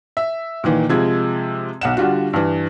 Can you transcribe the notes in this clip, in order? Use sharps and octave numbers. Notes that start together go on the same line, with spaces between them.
E5
A#2 D#3 E3
C3 F3 G#3 G#6
B1 F#5 E7
D3 G3 F4 F#4
G2 E3